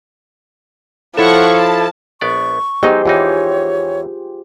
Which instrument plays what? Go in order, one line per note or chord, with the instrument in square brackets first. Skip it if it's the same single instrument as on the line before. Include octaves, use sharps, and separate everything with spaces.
[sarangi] F3 [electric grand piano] E4 C#5 E7 [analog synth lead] A4 [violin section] F#5 C#6
[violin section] A5
[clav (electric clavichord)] A#1 B3 D5 [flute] C#6
[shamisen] D#3 B3 D#5 [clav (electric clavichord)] F#3 D#4 [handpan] G4 G#4 C5
[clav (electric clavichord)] E2 E3 D#4 [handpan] F4 G4 [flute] C#5